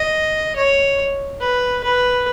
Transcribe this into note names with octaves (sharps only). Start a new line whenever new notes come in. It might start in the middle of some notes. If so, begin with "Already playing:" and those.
Already playing: D#5
C#5
B4
B4